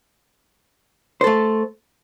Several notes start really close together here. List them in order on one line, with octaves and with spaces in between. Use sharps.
C5 A4 A3